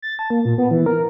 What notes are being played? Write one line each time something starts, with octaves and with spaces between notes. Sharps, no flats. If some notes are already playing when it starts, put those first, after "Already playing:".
A6
A5
A#3
A#2
B3
E3
A#4